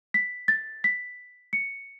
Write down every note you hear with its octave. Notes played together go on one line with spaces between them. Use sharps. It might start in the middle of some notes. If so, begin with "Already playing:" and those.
B6
A6
B6
C#7